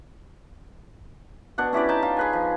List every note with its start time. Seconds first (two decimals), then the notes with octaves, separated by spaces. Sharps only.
1.58 B2 D4 F#5
1.73 C#4 E4 G4 D5
1.89 D#4 G5 A5
2.03 F4
2.17 G#4 B4 G#5
2.33 F3